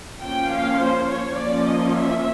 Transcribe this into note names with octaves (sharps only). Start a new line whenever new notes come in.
F3 A#3 C#4 G5
F5
C5
C#5
F3 A#3 C#4 D5
D#5
E5